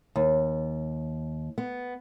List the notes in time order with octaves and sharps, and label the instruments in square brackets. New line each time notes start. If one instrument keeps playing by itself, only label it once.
[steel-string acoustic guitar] D#2
B3